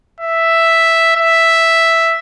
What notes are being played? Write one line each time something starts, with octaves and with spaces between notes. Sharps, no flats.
E5
E5